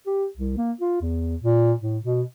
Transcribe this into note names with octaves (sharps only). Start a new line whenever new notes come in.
G4
C2
A#3
F4
E2
A#2
A2
B2